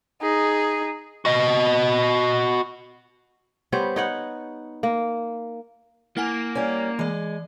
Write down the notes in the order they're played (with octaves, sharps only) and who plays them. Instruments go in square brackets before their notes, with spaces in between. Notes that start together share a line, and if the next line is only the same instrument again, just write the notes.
[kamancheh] D#4 G#4
[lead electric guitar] F#4 D#5
[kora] G3 B3 C5 C#5
D#4 C#5 F#5
A#3
[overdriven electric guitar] A#3 [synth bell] E4 F#5 G#5
[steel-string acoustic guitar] G3 C#4
[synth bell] E3 D5 [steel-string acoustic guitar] G#3